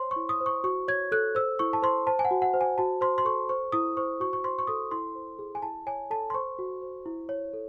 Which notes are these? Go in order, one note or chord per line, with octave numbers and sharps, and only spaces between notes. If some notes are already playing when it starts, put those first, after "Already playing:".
Already playing: C5 C#5 C6
C#6
E4
D#6
C5
C#6
F#4 C#6
C#5 G#6
A4 F#6
C5 E6
E4 C#6
A5
C5 C6
C5 A5
G#5
F#5
F#4
F#5
C5
G#5
F#4 A5
C5 C6
C6
A4 C#6
C5 C#6
E4 D#6
C5 C#6
F#4 C#6
C#6
C5 C6
C#6
A4 D#6
E4 C6
C5
G#4
G#5
E4 A5
C#5 G#5
A4 A5
C6
C5 C#6
F#4
C5
E4
C#5
A4